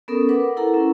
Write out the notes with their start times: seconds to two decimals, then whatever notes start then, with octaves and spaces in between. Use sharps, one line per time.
0.08 B3 C#4 A4 A#4 D#6
0.29 A#4 B4 F#5 D6
0.57 E4 A4 A#4 F#5 A#5
0.74 C#4 E4